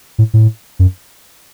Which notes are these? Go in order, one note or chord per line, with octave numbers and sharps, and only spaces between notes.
A2
A2
F#2